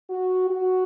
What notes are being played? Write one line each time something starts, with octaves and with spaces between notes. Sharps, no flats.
F#4
F#4